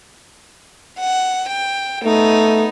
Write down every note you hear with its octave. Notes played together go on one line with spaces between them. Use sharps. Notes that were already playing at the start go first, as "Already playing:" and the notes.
F#5
G5
A3 B3 D#4